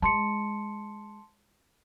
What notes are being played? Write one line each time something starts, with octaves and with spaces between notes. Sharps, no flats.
G#3 A5 C6 C#7